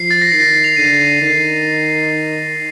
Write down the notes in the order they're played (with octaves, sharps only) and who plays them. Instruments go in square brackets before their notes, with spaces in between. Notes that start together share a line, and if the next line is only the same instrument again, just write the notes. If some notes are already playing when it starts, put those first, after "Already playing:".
Already playing: [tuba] F3 [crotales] C7
[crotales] A6
A#6
[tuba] D#3 [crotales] C7
[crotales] F7
[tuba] D3 [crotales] D#7
[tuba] D#3 [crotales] C7